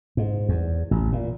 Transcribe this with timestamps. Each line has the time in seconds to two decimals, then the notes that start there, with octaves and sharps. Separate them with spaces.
0.17 G#2
0.49 E2
0.91 A1
1.13 A#2